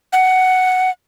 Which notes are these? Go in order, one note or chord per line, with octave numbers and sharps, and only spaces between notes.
F#5